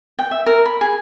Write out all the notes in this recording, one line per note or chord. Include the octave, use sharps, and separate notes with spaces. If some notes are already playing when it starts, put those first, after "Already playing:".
G5
E5
A#4
B5
G#4